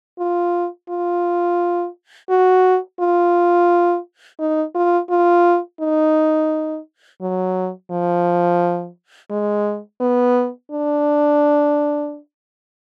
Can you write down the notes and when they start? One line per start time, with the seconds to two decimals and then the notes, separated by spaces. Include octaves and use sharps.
0.19 F4
0.90 F4
2.30 F#4
3.00 F4
4.40 D#4
4.75 F4
5.10 F4
5.81 D#4
7.21 F#3
7.91 F3
9.30 G#3
10.01 B3
10.71 D4